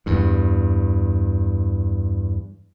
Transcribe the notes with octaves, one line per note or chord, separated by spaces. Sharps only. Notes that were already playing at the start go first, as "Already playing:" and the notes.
E2 G2